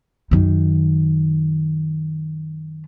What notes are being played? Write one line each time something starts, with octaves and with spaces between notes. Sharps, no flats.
F#2 D#3